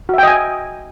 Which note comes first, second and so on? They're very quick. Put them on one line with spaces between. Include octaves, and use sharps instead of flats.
F#4 E5 G5 D#5 G#5